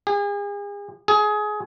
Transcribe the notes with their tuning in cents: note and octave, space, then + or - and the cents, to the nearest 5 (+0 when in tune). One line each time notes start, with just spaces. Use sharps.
G#4 -40
G#4 +20